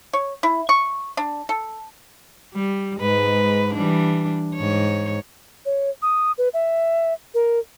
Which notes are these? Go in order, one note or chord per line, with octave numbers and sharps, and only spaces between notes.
C#5
E4
C#6
D4
A4
G3
G#2 G#3 B4
E3 G3 D4
G#2 C#5
C#5
D#6
B4
E5
A#4